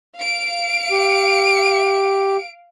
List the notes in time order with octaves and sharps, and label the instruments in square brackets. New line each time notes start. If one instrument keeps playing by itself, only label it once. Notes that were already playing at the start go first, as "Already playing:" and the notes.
[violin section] F5 D7
[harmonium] G4